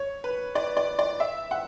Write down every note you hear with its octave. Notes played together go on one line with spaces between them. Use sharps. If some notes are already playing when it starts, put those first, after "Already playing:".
Already playing: C#5
B4
D5
D5
D5
E5
F#5